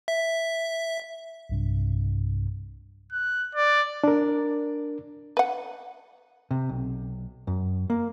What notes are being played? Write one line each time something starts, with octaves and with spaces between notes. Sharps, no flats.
E5
B1 G2 C3
F#6
D5
D4 A#4
B4 F#5
C3
B1
F#2
A#3